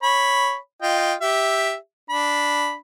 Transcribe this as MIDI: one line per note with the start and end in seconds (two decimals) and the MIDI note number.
0.03 0.57 73
0.03 0.57 83
0.82 1.14 65
0.82 1.14 75
0.82 1.14 79
1.21 1.75 67
1.21 1.75 76
2.10 2.75 62
2.10 2.75 83